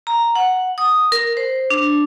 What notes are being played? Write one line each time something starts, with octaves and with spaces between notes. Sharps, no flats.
A#5
F#5
D#6
A#4
C5
D4